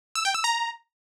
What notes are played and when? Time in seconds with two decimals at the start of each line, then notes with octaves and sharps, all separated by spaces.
0.15 E6
0.25 G5
0.35 E6
0.44 A#5